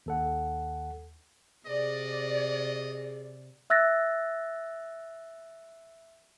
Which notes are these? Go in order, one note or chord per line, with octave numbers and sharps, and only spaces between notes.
D#2 A4 F#5
C3 G#4 D5 D#5
E5 E6 F#6 A6 A#6